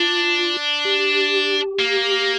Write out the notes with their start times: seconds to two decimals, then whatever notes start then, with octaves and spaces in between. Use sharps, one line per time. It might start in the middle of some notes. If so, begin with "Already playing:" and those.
Already playing: D4 F4
0.85 G4
1.79 A#3